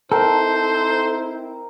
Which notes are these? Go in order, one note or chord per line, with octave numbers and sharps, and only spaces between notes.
C4 D#4 E4 A4 A#4 C5 G5